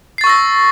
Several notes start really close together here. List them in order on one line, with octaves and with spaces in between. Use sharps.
C7 A6 C#6 E6 A#6